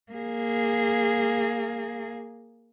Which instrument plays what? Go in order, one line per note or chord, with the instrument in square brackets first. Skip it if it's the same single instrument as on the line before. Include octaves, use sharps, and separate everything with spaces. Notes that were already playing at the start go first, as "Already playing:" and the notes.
[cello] A#3 G#4